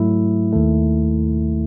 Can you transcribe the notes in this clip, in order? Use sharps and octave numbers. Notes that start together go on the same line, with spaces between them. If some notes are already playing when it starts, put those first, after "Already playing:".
Already playing: G#2 F#3 A3 E4
D#2 D#3 A3